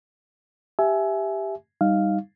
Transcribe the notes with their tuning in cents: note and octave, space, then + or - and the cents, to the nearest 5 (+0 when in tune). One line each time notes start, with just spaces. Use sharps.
G4 +5 E5 +0 G#5 +25
G3 +0 D#4 +0 F5 +0